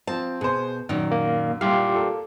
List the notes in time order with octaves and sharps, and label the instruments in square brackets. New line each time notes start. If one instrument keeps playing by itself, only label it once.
[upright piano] F3 C4 [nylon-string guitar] A5
[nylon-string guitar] B2 [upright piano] G#4 C5
[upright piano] F#2 [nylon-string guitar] A#2 D#3
[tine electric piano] A#3
[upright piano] A#2 E4 [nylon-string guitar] G3 [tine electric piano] F4 G4 F5
[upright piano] A#3 A4